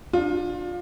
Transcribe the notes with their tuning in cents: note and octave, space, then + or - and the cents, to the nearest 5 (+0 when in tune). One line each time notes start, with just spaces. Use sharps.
D4 +25 F4 +25